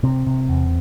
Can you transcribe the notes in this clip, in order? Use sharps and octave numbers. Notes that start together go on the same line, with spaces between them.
C3 C4
C3
E2